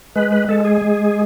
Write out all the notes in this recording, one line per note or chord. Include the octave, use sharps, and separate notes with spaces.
G#3 B4
B4
G#3 A4
G#4
G#3